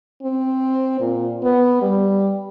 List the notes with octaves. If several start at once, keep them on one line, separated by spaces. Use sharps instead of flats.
C4
A#2
B3
G3